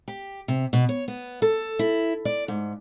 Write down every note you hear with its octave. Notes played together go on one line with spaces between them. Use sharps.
G4
C3
B2
C#5
B3
A4
E4
D5
G#2